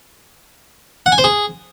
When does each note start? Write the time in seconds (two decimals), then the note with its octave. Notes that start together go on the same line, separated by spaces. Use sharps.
1.06 F#5
1.12 G#5
1.18 C5
1.24 G#4